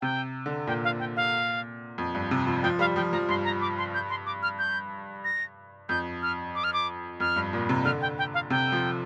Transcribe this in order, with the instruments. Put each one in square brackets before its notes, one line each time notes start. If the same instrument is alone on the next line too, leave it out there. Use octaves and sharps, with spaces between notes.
[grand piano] C3 [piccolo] G5
[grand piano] D3
[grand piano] A#2 [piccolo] G5
[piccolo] F5
G5
F5
[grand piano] F2
G2
C3
F3
[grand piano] F3 [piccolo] G5
[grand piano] G3 [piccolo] F5
[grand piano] F3 [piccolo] G5
[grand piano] F3 [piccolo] A#5
[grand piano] G2 [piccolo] C6
[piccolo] A#5
D6
C6
G6
C6
D6
F6
G6
A#6
[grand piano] F2 [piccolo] G6
[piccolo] F6
D6
F6
D6
[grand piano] F2 [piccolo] F6
[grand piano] G2
A#2
C3
[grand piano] D3 [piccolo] F6
[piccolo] G5
G5
F5
[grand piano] C3 [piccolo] G5
[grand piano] F3